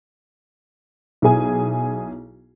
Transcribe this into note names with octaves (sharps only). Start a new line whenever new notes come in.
B1 E4 G#4 G#5